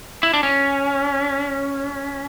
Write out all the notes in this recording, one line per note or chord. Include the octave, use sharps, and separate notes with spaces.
E4
D4
C#4